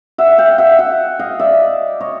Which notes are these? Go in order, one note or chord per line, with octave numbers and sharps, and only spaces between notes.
E5 F#5
F5 G5
E5 F#5
E5 F#5
D#5 F5
D5 E5
C#5 D#5